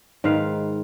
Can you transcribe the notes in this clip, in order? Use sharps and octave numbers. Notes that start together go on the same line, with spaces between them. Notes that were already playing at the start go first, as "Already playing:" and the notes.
G#2 D#3 B4 F5